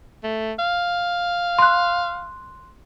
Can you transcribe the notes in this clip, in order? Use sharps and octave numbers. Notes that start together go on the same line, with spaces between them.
A3
F5
C6 F#6